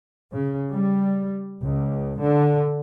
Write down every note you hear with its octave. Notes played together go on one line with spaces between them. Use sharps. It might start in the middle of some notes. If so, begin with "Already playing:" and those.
C#3
G3
C#2
D3